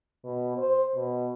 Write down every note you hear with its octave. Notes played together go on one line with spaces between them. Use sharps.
B2
C5
B2